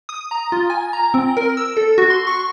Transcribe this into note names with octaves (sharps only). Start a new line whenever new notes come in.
D#6
A#5
F4
G#5
A#5
C4
A#4
E6
A4
F#4
C6
C#6